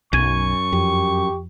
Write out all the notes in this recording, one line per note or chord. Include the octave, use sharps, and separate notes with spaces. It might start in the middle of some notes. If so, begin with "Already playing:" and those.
B1 F#2 G#5 C#6
F2 G4